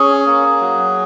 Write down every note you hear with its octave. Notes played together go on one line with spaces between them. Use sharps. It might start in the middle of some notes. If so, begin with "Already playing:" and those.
Already playing: C#4 G#4
A#3
F#3